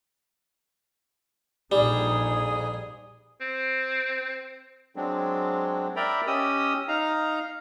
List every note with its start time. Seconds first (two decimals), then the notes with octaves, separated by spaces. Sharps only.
1.72 A#1 F2 G3 D#4 G#4
3.41 C4
4.96 F#3 G#3 C4 D4
5.96 A#4 D5 E5 G5 A#5 B5
6.27 C#4 G4 D#5 D#6 E6
6.88 D#4 F5 A#5